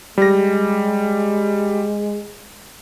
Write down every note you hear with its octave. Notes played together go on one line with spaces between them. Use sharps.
G3 G#3 A#6